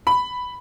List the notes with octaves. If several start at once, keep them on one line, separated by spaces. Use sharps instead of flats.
B5